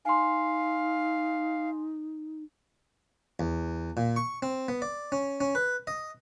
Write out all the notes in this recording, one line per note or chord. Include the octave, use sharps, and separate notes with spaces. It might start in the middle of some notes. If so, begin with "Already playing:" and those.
D#4 F5 G#5 C6
E2
A#2
C#6
C4
B3
D5
C#4
C#4
B4
D#5